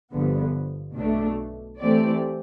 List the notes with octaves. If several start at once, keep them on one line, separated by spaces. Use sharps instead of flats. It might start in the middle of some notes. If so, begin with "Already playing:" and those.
G1 G2 D3 F3 B3
B1 B2 A3 D4
E3 A3 C4 G4 D5